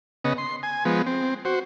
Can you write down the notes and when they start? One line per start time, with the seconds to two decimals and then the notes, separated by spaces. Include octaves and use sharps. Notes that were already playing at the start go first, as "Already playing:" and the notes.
0.25 C#3 B3 D#5
0.38 C6
0.63 G#5
0.85 F3 G#3 B3
1.06 C4
1.45 F#4 C5